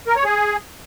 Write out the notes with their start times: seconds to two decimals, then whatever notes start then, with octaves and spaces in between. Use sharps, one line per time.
0.07 A#4
0.16 C#5
0.25 G#4